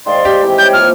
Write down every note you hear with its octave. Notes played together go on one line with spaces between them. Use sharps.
G#2 D#3 D5 F5 C6
G4
D#3 E3 C4
G3 C#5 G5 G6
A#2 F3 A#3 F6